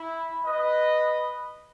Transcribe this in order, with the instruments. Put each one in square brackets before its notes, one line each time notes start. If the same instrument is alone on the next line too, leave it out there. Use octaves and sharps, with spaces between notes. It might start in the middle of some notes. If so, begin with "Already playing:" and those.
Already playing: [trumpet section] E4
B4 D#5